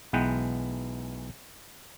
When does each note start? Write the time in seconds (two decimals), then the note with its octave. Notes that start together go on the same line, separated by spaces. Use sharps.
0.13 B1 E3 G#3 B3 F#5 G5